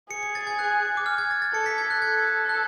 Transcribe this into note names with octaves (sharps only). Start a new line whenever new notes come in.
G#4 C#7
C#7
A6
G#6
F#6
D6
F6
G#6
A6
A6
A4 C#7
B6
G#6
F#6
A4 G#6
F#6